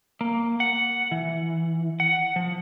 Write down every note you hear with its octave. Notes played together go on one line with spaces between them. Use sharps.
A#3
F#5
E3
F#5
F3